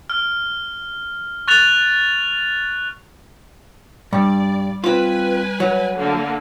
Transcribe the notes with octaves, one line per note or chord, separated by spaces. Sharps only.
F6
C#6 F#6 A6 F7
G2 G3 D5
C4 F4 B4 G#5
F#3
D3 A#3